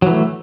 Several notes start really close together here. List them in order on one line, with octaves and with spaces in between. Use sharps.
F#3 E3 A3